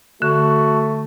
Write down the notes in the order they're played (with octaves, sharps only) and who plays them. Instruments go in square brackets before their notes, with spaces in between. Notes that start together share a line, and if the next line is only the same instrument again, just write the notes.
[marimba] D3 [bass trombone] A3 [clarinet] F#4